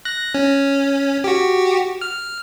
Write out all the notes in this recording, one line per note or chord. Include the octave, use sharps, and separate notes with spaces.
F#6 A#6
C#4
F#4 G4
F6